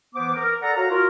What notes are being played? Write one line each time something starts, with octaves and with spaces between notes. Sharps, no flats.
E3 B3 C5 D6
A#4
A4 A#4 D5 F#5 A#5
F#4 A4 C#5 F5 A#5
F4 F#4 A#4